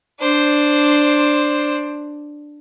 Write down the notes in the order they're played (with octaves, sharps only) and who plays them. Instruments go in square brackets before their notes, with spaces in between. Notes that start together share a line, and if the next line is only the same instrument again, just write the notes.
[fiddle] D4 C5